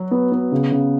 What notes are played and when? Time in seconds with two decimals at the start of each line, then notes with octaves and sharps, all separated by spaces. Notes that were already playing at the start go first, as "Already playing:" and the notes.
Already playing: F#3 F#4
0.11 B3
0.32 B3
0.52 C#3
0.72 C#3